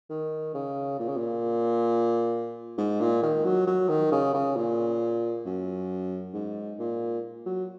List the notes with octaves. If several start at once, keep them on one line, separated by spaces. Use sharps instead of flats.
D#3
C#3
A#2
C#3
A#2
G#2
A#2
D#3
F#3
F#3
D#3
C#3
C#3
A#2
F#2
G#2
A#2
F#3